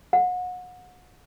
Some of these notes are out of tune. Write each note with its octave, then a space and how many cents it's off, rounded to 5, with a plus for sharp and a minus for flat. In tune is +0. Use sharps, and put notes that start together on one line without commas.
F#5 -30